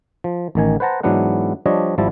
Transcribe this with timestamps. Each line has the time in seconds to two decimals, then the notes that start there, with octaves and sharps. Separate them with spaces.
0.24 F3
0.55 A1 D#3 G#5
0.80 B4 C5 F#5 A5 A#5
1.03 G#2 E3 F#3 B3 D4 F#5
1.66 F3 G3 D4 C#5 D#5
1.98 G#1 F3 G3 E4 A5